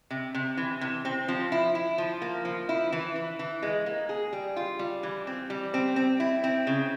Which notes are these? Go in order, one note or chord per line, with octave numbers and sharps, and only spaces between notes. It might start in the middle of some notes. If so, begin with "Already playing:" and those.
C3
C3
E3
C3
C4
F3
E4
E4
F3
A#3
F3
E4
E3
E3
E3
G#3
A#3
G#4
G3
F4
G3
E3
C4
G3
C4
C4
E4
C4
C#3